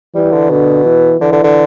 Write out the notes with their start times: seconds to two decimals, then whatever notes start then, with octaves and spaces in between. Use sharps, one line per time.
0.15 E3 G3
0.32 D3
0.50 B2 D3
0.85 E3
1.21 D3 E3
1.32 D3
1.44 D3